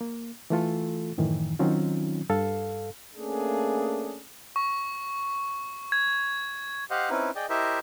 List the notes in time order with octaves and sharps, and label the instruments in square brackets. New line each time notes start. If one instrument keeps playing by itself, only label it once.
[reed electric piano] A#3
E3 A3 F4 A4
F#2 A2 D#3 E3
D#3 F#3 C4 C#4 D#4 F4
G2 A4 F5
[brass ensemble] A3 A#3 C#4 D4 G#4
[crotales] C#6
G#6
[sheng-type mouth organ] G4 C5 D#5 F5 F#5
C4 C#4 D#4 E4 B4
G#4 D5 D#5 G5
E4 G4 A#4 C5 D#5 E5